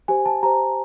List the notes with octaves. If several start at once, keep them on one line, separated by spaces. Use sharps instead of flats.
G4 C5 G#5
A5
G4 C5 A#5